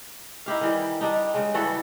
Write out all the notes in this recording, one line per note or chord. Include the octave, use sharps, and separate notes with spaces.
D#4 E4 G4 F5
D#3 E3 G3
G3 D4 D#4
C#3 G#3
E3 G3 F#4 A4